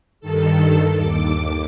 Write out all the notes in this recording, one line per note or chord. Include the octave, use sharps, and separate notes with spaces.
G2 D#3 A4
D#2 D6